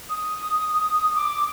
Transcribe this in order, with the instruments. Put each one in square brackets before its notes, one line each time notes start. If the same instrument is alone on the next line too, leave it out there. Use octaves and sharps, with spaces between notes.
[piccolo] D#6
D6